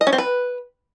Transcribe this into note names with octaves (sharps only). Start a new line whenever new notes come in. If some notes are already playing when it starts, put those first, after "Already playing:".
D#5
C#4
C4
B4